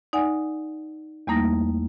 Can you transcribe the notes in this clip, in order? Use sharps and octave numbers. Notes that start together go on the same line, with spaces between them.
D#4 D5 F#5 G#5
E2 G3 A3 A#3 D#4 A#6